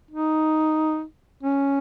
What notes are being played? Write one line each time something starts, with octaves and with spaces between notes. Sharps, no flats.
D#4
C#4